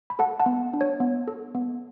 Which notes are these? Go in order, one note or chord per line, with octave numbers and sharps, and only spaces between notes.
B5
A4 F#5 A5
F#5 A5
B3
D4
C#5
B3
A4
B3